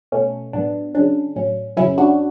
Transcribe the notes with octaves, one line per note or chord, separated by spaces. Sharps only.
B2 A3 C#4
A2 F#3 B3 D4
C#3 F#3 C#4 D4
A2 F#3 C#4
F#2 C#3 F#3 C#4 E4
D4 F#4